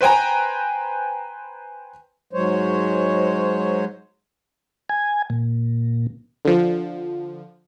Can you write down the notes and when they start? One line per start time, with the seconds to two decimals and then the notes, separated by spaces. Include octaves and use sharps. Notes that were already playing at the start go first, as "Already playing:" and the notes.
0.01 B4 C5 G5 G#5 A#5
2.33 G#2 F#3 G#3 C5 C#5
4.89 G#5
5.30 A#2
6.45 D3 F3